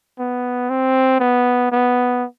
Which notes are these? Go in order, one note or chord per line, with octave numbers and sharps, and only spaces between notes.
B3
C4
B3
B3